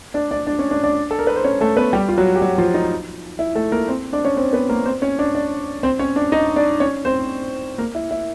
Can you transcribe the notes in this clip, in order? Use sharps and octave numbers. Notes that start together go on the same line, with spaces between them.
D4 D5
D4 D5
D4 D5
C#4 C#5
D4 D5
D4 D5
A4
A#4
B4
C5
C#4 C#5
A3 A4
B3 B4
G3 G4
F4
F#3 F#4
G4
F#3 F#4
F3 F4
D#4
E4
A3 A4
A#3 A#4
C4 C5
D4 D5
C#4 C#5
C4 C5
B3 B4
A#3 A#4
C4 C5
C#4 C#5
D4 D5
D4 D5
C4 C5
C#4 C#5
D4 D5
D#4 D#5
D4 D5
C#4 C#5
C4 C5
A#3 A#4
E4
E4